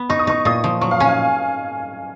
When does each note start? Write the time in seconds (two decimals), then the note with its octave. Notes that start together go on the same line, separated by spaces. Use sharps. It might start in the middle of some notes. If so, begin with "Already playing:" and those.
Already playing: B3
0.10 D#4 C#6
0.19 D#6
0.27 D#4 C#6
0.45 A#2 D#6
0.64 F3
0.81 F#3 C#6
0.91 F5
1.00 C#4 G#5
1.09 F5